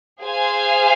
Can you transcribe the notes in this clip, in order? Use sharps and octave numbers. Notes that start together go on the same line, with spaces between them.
G#4 C5 F5 G#5